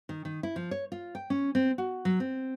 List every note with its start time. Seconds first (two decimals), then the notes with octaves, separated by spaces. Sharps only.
0.09 D#3
0.25 D#3
0.43 E4
0.56 F3
0.71 C#5
0.92 F4
1.15 G5
1.30 C#4
1.55 C4
1.78 F#4
2.05 F#3
2.20 C4